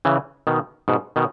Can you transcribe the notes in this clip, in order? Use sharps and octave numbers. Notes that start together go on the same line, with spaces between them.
C#3 E3
B2 D#3
G#2 B2
B2 D#3